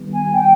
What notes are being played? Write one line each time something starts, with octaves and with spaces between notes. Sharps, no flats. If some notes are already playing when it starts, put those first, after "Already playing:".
Already playing: D#3 G3 B3
G#5
G5